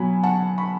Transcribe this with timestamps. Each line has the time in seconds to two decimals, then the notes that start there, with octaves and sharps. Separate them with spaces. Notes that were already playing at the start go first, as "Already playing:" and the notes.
Already playing: B2 F#3 G#5 B5
0.24 F#5 A5
0.58 B5